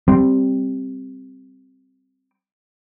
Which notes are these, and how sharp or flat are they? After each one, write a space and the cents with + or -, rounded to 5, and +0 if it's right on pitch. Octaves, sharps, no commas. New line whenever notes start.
G3 +0 C4 +0